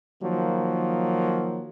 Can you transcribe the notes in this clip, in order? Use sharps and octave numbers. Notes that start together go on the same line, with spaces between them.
D#3 F3 F#3 A#3